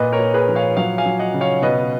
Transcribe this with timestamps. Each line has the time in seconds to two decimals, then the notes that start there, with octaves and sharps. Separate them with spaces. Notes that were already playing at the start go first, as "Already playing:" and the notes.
Already playing: A#2 B4 D#5
0.12 A#4 C#5
0.19 A#2
0.34 G#4 B4
0.48 F3
0.55 C#5 F5
0.77 F#3 C#5 F5
0.98 F5 G#5
1.05 F#3
1.19 D#5 F#5
1.34 C#3
1.41 C#5 F5
1.62 B2 B4 D#5